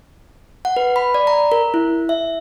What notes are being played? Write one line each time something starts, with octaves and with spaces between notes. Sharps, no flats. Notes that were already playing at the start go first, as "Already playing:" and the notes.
F#5
B4
B5
D5
A#5
A#4
E4
E5